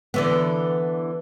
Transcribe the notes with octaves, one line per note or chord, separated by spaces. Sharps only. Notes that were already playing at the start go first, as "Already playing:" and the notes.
D3 E3 B3